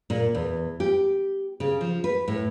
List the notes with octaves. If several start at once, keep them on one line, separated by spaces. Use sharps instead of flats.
A#2
E2
G4
C#3
F3
B4
A2